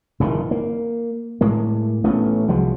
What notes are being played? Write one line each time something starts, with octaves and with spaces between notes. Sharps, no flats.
F#1 A#2 D#3 E3
A#3
A2 G#3 A#3
A1 A3 B3 C#4
C2 F3 F#3 G#3